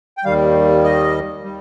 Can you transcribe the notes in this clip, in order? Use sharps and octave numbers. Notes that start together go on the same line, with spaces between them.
G5
D#2 D#3 G3 F5
D#5
G3